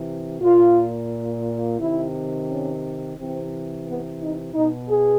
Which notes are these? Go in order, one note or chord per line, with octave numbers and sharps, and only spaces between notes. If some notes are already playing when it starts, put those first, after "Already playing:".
Already playing: C3 E3
A#2 F4
C3 D#3 E4
C#4
C3 E3 C4
B3
D#4
B2 D#4
G#4